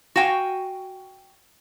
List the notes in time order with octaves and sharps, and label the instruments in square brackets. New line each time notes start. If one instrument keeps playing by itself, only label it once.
[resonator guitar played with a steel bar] F#4 F5 G5 G#5